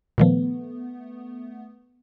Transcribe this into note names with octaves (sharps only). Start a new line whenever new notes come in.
A#2 D#3 F3 A3 B3